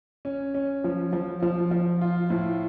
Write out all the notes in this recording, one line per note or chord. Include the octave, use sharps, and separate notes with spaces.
C#4
C#4
F3
F3
F3
F3
F4
A2